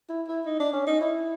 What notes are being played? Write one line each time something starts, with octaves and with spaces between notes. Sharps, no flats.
E4
E4
D#4
D4
C#4
D#4
E4